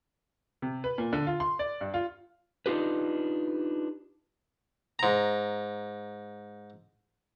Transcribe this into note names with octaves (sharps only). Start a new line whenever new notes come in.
C3
B4
A#2
D3
F4
C6
D5
G2
F4
D4 D#4 F4 G4 B4
G#2 A#5